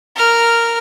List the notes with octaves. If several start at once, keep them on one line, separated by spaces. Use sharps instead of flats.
A#4 F6